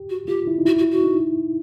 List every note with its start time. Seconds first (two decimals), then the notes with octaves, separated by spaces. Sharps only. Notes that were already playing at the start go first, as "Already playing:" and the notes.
Already playing: G4
0.10 F#4
0.28 F4 G4
0.47 E4
0.59 D#4
0.65 E4 F#4
0.78 F#4
0.91 F#4
1.04 D#4